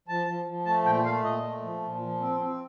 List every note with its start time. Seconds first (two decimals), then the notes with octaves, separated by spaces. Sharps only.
0.08 F3 A5
0.27 F3
0.46 F3
0.65 A3 A5
0.84 A#2 G5
1.04 A3 F5
1.24 A#2 D#5
1.43 A3
1.62 F3
1.82 A#2
2.02 F3
2.21 C4
2.40 C4